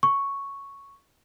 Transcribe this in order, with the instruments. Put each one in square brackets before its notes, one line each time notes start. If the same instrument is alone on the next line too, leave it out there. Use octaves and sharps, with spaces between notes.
[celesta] C#6